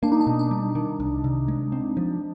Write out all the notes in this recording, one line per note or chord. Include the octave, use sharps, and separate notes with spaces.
A#3 D4
D#4
D4
B2
D4
G3
D#3
C2
C3
G#3
C4
F3